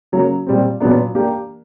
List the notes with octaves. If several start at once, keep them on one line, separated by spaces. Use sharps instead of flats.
C#3 F#3 A#3
A#2 G3 C4
A#2 F#3 B3 D4
A#3 D4 G4